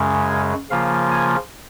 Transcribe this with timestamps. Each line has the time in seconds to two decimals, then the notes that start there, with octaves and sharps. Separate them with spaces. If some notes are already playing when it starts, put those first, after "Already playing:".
Already playing: F#2 C#3 G#3
0.29 G#4
0.70 C#3 F3 A#3 F4 F5
1.11 G#5